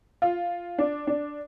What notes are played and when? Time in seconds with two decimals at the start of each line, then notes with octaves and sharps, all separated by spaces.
0.22 F4
0.78 D4
1.07 D4